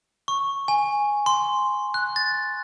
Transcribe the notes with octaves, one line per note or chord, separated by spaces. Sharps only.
C#6
G#5
C6
F#6
A6